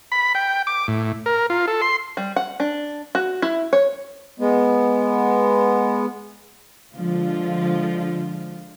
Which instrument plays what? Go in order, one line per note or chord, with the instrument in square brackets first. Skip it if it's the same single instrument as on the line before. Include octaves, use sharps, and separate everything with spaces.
[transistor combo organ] B5
G5
D6
A2
A#4
F4
A4
C6
[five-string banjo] G3
F#5
D4
F#4
E4
C#5
[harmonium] G#3 B3
[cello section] D3 F3 G#3 F4